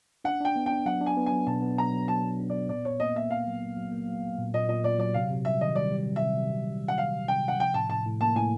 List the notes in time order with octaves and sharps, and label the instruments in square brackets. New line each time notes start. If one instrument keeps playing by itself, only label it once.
[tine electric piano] D4 [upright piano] F#5
[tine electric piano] D4 [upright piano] G5
[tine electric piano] B3
[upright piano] G5
[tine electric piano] D4
[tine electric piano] F#3 [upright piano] F#5
[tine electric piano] D4
[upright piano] G#5
[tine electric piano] B3
[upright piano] G#5
[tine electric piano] F#3
[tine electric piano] B2 [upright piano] A5
[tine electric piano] B3
[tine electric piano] F#3 [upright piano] A#5
[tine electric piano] F#3
[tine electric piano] F#3 [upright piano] A5
[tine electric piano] B3
D4
[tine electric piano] B3 [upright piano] D5
[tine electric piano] A#2 [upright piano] D5
[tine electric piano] A#2 [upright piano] C#5
[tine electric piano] A#3 [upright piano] D#5
[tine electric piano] A#3 [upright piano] E5
[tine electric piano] A#2 [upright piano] F5
[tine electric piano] F#3
F#3
F#3
A#3
F#3
A#3
A#2
[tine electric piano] A#2 [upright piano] D#5
[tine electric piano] A#2 [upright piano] D#5
[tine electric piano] A#2 [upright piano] D5
[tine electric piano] F#3 [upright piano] D5
[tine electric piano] C3 [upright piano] F5
[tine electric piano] C3
[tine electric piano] G3 [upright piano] E5
[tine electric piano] D#3 [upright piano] D#5
[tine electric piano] G3 [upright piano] D5
[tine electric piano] G3
C3
[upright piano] E5
[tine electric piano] C3
C3
C3
C3
[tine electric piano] D#3 [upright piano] F#5
[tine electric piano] C3 [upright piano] F5
[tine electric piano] C3
[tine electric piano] C3 [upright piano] G5
[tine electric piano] C3 [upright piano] F#5
[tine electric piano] F3 [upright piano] G5
[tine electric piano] A2 [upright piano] A5
[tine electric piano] A2 [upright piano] A5
[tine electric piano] A2
[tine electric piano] A#3 [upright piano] A5
[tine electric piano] A2 [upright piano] G#5